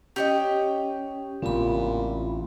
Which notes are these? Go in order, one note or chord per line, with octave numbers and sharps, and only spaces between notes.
C#4 G4 C#5 D#5
A1 A#2 C#3 C4 B5